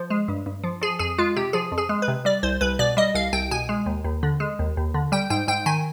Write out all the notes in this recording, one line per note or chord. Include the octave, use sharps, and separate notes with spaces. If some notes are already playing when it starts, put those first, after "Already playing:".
Already playing: F3 C5
G#3
G2
G2
F3
F3 G#4
F2 G#4
G#3 F4
C3 G4
F3 G#4
F2
G#4
G#3
B4
C3
G3 D5
C2 C5
C2 B4
B2 D5
G3 D#5
C2 F5
C2 G5
B2 G#5
G#3
D#2
D#2
D3
G#3
D#2
D#2
D3
G3 G5
G#2 G5
G#2 G5
D#3 G#5